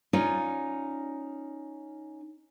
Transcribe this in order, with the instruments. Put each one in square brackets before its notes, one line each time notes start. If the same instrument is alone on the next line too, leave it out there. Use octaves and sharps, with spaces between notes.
[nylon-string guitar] C#4 D#4 F4 C#5 D5